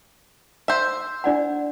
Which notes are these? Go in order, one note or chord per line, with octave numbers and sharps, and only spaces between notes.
C5 E5
D4 D5 F#5